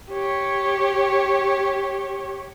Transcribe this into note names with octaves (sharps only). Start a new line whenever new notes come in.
G4 C#5